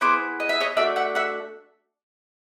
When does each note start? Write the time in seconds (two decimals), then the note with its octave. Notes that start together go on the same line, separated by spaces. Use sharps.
0.01 B3 E4 G#4 C5 D5
0.40 D#5
0.49 E5
0.60 C#5 D#5
0.77 A3 D4 F#4 D5 E5
0.96 E5 F#5
1.15 E5 F#5